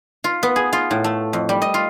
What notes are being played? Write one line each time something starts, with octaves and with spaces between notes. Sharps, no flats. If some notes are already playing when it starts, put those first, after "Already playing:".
F4
B3
G#4
F4
A2
A3
F2
G3
D#5
F4